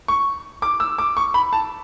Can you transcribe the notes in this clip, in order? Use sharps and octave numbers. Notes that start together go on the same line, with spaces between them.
C#6
D6
E6
D6
C#6
B5
A5